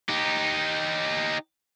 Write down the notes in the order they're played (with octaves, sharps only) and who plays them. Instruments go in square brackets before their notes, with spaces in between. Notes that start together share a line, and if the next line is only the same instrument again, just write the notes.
[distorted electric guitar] D#4 G4